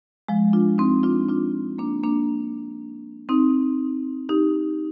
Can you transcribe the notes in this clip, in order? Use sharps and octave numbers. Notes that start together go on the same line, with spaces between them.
F3 G#3
D4 F4
C4 D#4
D4 F4
D4 F4
A#3 D4
A#3 D4
C4 D#4
D#4 G4